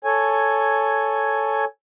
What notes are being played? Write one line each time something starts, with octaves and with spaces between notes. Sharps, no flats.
A4 C#5 G#5